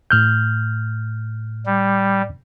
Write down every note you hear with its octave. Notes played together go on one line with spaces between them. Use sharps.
A2 F6 G6
G3